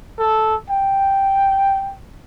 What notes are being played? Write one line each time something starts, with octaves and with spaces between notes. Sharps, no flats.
A4
G5